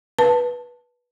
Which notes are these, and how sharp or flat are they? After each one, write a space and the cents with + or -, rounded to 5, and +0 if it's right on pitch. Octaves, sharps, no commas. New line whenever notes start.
B4 -15 A5 +0